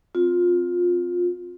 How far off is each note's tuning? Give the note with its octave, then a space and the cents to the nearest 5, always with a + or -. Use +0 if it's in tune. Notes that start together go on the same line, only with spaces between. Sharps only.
C4 +0 F4 +20